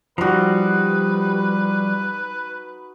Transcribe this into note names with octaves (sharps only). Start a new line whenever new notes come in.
F3 G3 D#4 F#4 B4